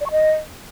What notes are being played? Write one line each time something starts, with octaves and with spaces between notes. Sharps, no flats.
D5
C#6
D#5